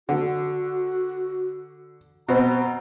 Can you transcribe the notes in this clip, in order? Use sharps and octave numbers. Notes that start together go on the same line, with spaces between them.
D3 F#4
B2 C4 A#5